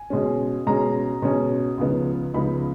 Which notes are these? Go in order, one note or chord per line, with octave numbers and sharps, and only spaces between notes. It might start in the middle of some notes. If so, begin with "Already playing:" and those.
Already playing: G#5
B2 G#3 C#4
B2 G#3 C#4 A#5
B2 G#3 C#4
C#2 C#3 F3 B3 D#4
C#2 C#3 F3 B3 D#4 B5